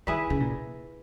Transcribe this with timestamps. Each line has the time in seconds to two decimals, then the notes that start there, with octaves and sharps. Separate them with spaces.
0.07 D#3 E4 G#4 B4
0.30 C#3
0.40 A#2